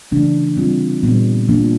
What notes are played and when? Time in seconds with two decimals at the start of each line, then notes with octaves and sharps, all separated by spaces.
0.12 C#3 E3 A3 D4
0.57 G3 C4 F4
1.03 A#2 G3 B3
1.49 F3 A#3 D4